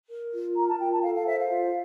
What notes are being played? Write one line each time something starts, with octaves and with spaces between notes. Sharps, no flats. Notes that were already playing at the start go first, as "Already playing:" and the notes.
A#4
F4
A#4 A#5
A5
F4 G5
A5
A4 F5
F5
C5 E5
F5
F4